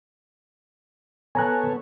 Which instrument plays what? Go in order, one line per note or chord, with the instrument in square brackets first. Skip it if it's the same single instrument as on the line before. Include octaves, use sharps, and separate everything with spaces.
[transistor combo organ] B3 A4 C#5 [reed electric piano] G#5 A#5 F#6